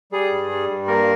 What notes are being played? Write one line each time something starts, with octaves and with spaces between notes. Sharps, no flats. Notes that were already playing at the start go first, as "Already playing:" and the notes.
G3 G#4
G2
G3
G2
A#3 A#4